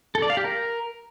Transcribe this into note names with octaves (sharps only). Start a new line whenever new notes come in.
A4
D5
F5
G4
A#4